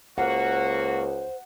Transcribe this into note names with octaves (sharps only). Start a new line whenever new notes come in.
C#2 A#3 F#4 C5 F#5